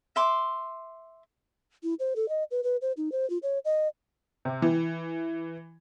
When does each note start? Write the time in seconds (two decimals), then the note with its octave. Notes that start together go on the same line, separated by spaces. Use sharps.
0.16 E5 C6 D6
1.83 E4
2.00 C5
2.16 A4
2.29 D#5
2.51 B4
2.63 B4
2.82 C5
2.97 D#4
3.12 C5
3.30 F4
3.43 C#5
3.65 D#5
4.45 C3
4.62 E3